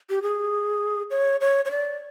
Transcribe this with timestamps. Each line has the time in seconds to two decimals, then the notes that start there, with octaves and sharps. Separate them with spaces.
0.10 G4
0.22 G#4
1.11 C#5
1.41 C#5
1.65 C#5
1.71 D5